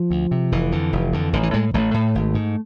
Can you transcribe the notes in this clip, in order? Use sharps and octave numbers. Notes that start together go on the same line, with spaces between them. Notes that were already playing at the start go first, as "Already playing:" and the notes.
Already playing: F3
D2
C3
F1 E3
F2 D3
F1
F2 D3
A1 D3
E3
A2 G#3
A1 A3
A2
G#1
G#2